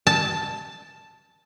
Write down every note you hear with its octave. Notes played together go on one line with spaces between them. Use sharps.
A5